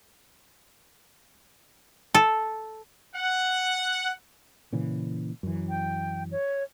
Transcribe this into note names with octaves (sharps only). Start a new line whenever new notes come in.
A4
F#5
A#2 C#3 E3
F#2 E3
G5
C#5